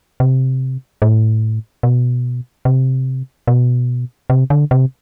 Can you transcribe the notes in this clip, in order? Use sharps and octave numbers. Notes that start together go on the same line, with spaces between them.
C3
A2
B2
C3
B2
C3
D3
C3